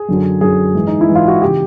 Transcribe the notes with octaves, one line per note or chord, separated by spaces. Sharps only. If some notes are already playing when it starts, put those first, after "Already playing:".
Already playing: G#4
F#2 D3 F#3
F#2 D3 F#3 G#4
G#2 E3
D#4
E4
G#2 E3
F4
F#4
C#3 E3 G4